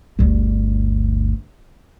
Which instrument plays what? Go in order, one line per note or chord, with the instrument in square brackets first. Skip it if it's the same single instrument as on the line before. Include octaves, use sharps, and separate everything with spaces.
[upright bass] G1 D2